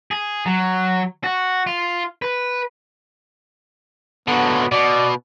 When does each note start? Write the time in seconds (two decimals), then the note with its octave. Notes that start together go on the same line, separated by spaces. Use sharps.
0.11 G#4
0.46 F#3
1.24 F#4
1.67 F4
2.22 B4
4.28 D3 F#3 B3
4.72 B2 D5